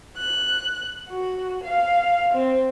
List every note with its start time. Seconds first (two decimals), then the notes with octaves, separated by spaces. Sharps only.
0.16 F#6
1.07 F#4
1.63 F5
2.33 C4